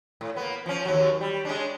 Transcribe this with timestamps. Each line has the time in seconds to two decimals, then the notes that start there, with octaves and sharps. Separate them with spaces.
0.21 A2
0.36 A#3 B3
0.66 F3 C#4
0.86 D#2 F#3
1.21 G3
1.45 G#3 C#4 D4